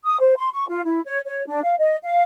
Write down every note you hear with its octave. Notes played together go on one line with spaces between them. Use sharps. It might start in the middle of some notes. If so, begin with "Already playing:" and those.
D#6
C5
C6
C#6
F4
E4
C#5
C#5
D4
F5
D#5
F5